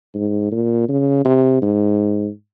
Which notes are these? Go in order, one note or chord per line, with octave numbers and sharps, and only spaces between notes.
G#2
A#2
C#3
C3
G#2